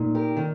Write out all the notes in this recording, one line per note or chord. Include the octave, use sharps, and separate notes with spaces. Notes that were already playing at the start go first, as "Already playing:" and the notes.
Already playing: A#2 D#4
G4 A#4
D#3